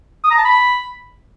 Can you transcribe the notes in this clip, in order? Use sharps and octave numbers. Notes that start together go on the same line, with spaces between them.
D#6
A#5
A5
B5